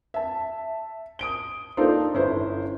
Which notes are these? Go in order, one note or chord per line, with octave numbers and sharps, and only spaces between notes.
E5 A5
D#6 D7 G7
A#3 D4 D#4 F4 A4 C5
G1 C#4 E4 B4 C5